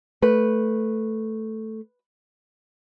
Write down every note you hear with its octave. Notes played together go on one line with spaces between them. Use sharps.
A3 B4